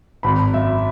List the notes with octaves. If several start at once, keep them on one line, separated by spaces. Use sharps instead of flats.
G#1 B5
F#2 E5